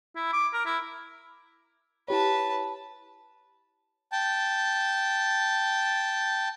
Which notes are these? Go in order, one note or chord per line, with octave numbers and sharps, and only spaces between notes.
E4
D6
A#4
E4
E4 G4 B4 C#5 A5
G5 A5